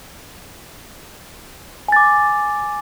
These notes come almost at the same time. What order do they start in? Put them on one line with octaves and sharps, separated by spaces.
G#5 A6 D6